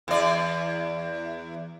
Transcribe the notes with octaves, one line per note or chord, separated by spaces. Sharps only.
E2 D5